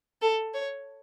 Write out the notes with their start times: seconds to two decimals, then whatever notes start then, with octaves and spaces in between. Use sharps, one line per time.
0.22 A4
0.54 C#5